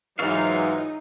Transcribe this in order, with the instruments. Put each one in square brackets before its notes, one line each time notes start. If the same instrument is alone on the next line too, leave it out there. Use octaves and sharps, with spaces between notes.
[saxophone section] G#2 E3 [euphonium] F#3 [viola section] D#4 [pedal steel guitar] F4 C#5 F5